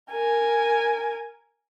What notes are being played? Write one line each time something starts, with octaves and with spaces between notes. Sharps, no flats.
A#4 G#5